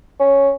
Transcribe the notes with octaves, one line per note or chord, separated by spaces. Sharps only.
C#4